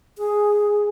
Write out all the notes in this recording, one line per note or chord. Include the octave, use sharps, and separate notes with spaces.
G#4